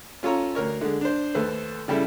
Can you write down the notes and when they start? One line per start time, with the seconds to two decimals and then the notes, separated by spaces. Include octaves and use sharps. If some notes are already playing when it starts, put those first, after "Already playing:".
0.23 C#4 F4 A4 C#5 A#5
0.55 D2 A#4 C#5
0.81 D3 G#3
1.01 D4 C5
1.35 D#2 A3 A4 B4 C5
1.88 C#3 G3 E4 A4